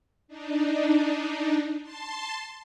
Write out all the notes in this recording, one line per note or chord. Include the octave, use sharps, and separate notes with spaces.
D4 D#4
A5 C6